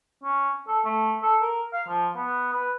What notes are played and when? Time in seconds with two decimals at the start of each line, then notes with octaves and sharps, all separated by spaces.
0.23 C#4
0.68 A4
0.85 A3
1.23 A4
1.42 A#4
1.73 F5
1.88 F3
2.16 B3
2.53 B4